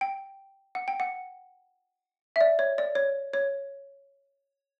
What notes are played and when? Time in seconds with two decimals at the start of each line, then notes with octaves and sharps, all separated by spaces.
0.01 G5
0.75 F#5
0.88 G5
1.00 F#5
2.36 E5
2.41 D5
2.59 C#5
2.78 D5
2.95 C#5
3.34 C#5